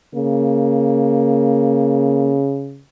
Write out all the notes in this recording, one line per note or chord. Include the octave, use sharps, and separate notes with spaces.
C#3 A#3